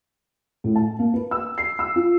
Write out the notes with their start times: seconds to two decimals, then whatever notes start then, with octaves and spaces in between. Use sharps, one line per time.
0.64 A2
0.75 A5
0.99 A#3
1.14 B4
1.31 E6
1.58 C7
1.79 E6
1.96 F4